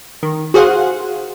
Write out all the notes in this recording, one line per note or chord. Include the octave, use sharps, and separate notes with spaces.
D#3
F#4 G#4 C5 F5 F#5